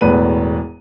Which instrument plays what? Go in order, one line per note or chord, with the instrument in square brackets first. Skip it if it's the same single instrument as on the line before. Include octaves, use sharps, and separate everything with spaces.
[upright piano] E1 E2 A2 B4 D#7